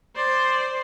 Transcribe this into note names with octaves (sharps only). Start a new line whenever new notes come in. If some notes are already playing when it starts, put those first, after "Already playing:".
C5 D5